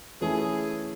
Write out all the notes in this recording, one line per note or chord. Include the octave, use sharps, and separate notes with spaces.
E3 A3 C#4 E4 G#4